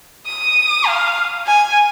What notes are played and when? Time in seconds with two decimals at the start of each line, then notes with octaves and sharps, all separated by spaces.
0.27 D#6
0.87 F5
1.47 G#5